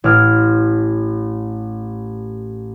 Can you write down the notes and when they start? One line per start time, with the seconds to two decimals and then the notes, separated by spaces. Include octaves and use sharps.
0.04 A1 E4 D6 F6